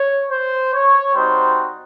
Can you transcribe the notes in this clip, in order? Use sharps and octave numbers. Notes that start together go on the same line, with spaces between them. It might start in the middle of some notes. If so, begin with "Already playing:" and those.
Already playing: C#5
C5
C#5
G3 C4 D#4 F#4 C5